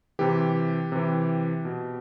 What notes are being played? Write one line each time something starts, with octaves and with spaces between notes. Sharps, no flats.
C3 E3 G4
C3 E3
B2